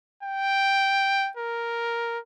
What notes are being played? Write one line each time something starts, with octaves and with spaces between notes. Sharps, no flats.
G5
A#4